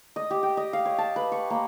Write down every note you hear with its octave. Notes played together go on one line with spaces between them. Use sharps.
D#5
G4
G5
D#5
F5
C#5
A5
B4
C#6
A#3